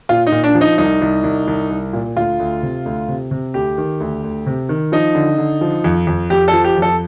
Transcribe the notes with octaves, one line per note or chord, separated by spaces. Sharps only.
A#2 F4
D#4
A#2
D4
F3
D#4
C2 D#4
C2
C2
C2
C2
A#2
D2 F4
D2
C3
D2
C3
C3
D2 G4
D#3
D2
D2
C3
D#3
F3 D#4
D3
D3
F3
F2
F2
F2 G4
A4
F3
G4
F2
A4